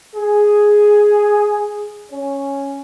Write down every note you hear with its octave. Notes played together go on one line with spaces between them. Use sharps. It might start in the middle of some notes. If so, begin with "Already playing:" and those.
G#4
C#4